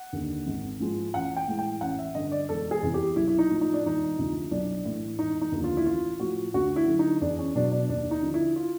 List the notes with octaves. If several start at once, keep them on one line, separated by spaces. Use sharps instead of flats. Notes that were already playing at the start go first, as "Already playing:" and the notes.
Already playing: F#5
D#2 D3
G#1
G#2 F3 G#3
A1 F#5
G5
A2 E3 G#3
G5
A1 F#5
E5
G2 D3 D#5
D5
E1 A4
G#4
E2 C3
G4
B1 E4
E4
D#4
A2 F3
D#4
D4
E1 D#4
D2 C3 F3
B1 D4
A2 E3
E1 D#4
D#4
D#2 D3 F3
F4
E4
A1 F4
A2 F3 F#4
D2 F#4
E4
D3 F#3
D#4
E2 D4
C#4
B2 F#3 D4
D4
D#2 D4
D#4
D3 F3
E4
F4